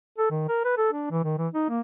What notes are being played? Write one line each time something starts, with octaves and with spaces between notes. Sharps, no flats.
A4
D#3
A#4
B4
A4
D4
E3
D#3
E3
D#4
A#3